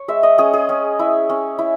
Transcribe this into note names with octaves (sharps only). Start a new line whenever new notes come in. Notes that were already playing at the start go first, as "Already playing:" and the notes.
Already playing: C#5
G#3 E5
D#5
C#4 G#4
G#4
C#4
E4
C#4
E4